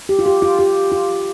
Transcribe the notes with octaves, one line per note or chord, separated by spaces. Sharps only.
G4
F4
G4
F4
G4
F4